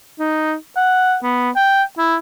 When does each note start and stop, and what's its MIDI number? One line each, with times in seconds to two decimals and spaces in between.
0.19 0.55 63
0.76 1.16 78
1.23 1.50 59
1.56 1.83 79
1.98 2.16 64